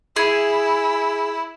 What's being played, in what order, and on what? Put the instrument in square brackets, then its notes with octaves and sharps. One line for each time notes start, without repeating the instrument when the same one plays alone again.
[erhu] E4 [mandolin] G#4